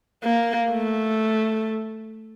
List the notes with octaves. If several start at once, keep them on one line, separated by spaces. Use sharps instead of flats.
A#3
A3